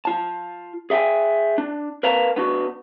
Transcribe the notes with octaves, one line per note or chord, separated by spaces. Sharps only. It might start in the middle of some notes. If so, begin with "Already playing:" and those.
F4 A5
G#4 E5 F5 G5 G#5
D4
A#4 B4 F5 A5 A#5
B3 D4 F#4